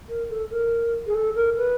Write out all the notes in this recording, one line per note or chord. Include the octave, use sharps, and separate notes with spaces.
A#4
A4
A#4
G#4
A4
A#4
B4